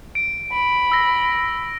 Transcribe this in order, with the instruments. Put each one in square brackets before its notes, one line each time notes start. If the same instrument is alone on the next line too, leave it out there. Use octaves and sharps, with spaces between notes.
[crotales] D7
[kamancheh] B5
[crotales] E6 A#6